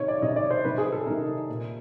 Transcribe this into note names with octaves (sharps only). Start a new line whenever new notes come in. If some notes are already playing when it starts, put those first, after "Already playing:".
Already playing: C3 D#3 C#5
D5
C3 D#3 D#5
D5
C5
C3 D#3 B4
G#4
A4
C3 D#3 A#4
A#2